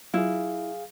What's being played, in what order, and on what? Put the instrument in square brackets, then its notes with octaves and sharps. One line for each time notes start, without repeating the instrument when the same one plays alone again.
[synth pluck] F#3 F4 [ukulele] E4 [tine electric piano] G#4 F5